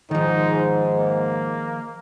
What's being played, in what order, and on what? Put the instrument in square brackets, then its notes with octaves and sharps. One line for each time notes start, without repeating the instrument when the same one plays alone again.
[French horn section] G#2 [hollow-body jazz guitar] D#3 F3 [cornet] D#4
[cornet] A#3